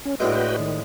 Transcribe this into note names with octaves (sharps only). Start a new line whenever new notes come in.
C#4
A2 D3 G#3 F#4 B4 G5
D#3